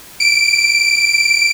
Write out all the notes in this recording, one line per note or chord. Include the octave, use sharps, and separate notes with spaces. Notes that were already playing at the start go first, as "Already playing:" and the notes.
D7